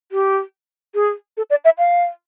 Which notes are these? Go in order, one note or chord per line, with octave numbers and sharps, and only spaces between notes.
G4
G#4
A4
D5
E5
F5